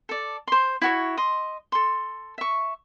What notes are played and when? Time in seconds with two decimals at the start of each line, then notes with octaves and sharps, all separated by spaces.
0.09 A4 D5
0.47 C5 C6
0.82 E4 F#4 C#5
1.17 D#5 C6
1.72 A4 C6
2.38 E5 C#6